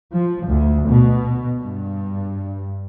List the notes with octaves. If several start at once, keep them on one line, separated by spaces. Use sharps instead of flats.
F3
D2
B2
G2